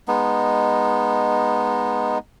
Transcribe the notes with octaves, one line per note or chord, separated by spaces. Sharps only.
G#3 B3 D#4